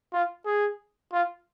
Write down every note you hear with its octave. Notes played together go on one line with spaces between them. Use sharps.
F4
G#4
F4